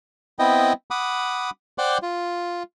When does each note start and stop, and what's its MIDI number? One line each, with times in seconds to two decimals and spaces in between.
0.39 0.73 59
0.39 0.73 60
0.39 0.73 64
0.39 0.73 75
0.39 0.73 79
0.91 1.50 78
0.91 1.50 83
0.91 1.50 86
0.91 1.50 87
1.78 1.98 72
1.78 1.98 74
1.78 1.98 78
1.78 1.98 79
1.78 1.98 84
1.78 1.98 86
2.02 2.63 65